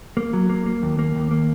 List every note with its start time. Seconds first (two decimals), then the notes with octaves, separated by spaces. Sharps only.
0.17 A#3
0.33 F#3
0.50 A#3
0.66 A#3
0.82 D#2
0.99 A#3
1.16 D#2
1.31 A#3